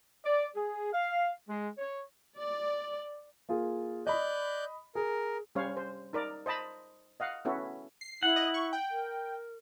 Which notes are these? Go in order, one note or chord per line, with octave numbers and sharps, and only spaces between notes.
D5
G#4
F5
G#3
C#5
D5
A#3 F4 G#4
D5 D#5 B5 F#6 G6
G#4 A#4
G3 C#4 C5 C#5 F5
C5
D#4 A#4 D5
C5 D#5 A5 B5
D#5 F5 F#5
B3 C#4 E4 F#4 A4
C7
E4 F#5
D#5
C#6
G5
A#4